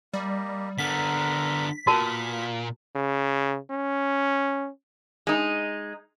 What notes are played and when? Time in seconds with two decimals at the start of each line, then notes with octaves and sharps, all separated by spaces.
0.13 G3 A#3 G4 D#5
0.78 D3 B3 A#4 A#5 B6
1.87 A#2 B3 F#4 A#4 F5 A5
2.95 C#3
3.71 C#4
5.27 G#3 D#4